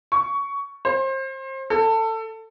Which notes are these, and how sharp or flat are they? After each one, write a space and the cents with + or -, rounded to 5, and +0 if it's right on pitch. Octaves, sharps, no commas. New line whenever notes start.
C#6 +15
C5 +30
A4 +20